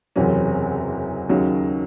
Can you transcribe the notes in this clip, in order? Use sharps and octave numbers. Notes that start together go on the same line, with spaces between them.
F#1 E2 C3 F#3 C#4
D#2 C#3 F#3